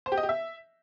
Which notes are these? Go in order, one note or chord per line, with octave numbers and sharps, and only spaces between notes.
C5
G4
D#5
G4
E5